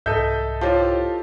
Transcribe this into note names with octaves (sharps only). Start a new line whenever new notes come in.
C2 G#2 A4 D#5 E5 G6
E4 F4 G4 C5 C#5 A5